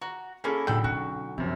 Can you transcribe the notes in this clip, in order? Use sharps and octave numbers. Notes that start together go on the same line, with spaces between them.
F#4 A#5
A#3 C#4 E4 G#4 A4 G#5
B1 A2 D3 A4 G5 B5 G6
C#4 F#4
F#2 C3 F3